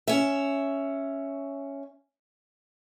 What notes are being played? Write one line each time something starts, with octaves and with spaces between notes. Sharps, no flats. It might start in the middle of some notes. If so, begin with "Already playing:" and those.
C#4 E5